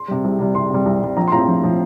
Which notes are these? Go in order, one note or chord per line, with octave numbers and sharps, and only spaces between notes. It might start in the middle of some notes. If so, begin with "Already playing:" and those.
Already playing: C6
C3 G3
C2
C3 G3
C2 C6
C3 G3
C2
C3 G3
A#1 A#5
C6
A2 F3 C4 A#5
A#1
A2 F3 C4